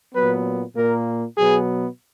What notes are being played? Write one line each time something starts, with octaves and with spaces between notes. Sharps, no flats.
A#2 F#3 B3 B4
A#2 A#3 A#4
B2 F#3 B3 G#4